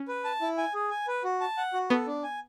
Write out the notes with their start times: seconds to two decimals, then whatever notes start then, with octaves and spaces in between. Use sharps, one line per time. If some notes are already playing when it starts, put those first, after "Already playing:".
Already playing: C#4
0.08 B4
0.24 A5
0.41 E4
0.58 G#5
0.74 G#4
0.91 G#5
1.07 B4
1.24 F#4
1.41 A5
1.57 F#5
1.73 F#4
1.90 B3 A4
2.07 D4
2.23 G#5